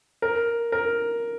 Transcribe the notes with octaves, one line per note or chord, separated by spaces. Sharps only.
A#4
A#4